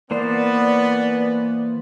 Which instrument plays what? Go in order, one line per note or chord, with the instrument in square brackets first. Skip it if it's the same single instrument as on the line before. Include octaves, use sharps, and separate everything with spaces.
[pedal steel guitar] E3 A#3 C5 [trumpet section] B3 [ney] D5